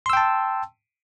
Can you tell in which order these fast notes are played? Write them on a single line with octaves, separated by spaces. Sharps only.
C6 E6 G5 A5